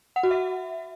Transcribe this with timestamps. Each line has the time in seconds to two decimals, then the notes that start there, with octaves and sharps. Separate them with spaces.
0.16 F#5
0.23 F#4
0.31 E5